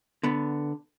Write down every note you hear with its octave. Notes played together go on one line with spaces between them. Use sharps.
D3 B3